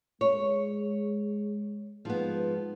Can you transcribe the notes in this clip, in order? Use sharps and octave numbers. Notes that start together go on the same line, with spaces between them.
G#3 C#5
G#2 F3 B3